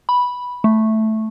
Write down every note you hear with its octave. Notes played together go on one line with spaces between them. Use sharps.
B5
A3